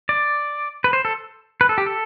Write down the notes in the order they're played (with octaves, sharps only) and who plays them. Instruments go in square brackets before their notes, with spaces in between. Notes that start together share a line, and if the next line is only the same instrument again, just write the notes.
[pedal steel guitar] D5
B4
C5
A4
B4
A4
G4
A4